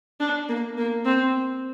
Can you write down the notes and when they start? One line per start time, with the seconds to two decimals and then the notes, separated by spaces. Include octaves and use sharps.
0.20 D4
0.49 A#3
0.77 A#3
1.05 C4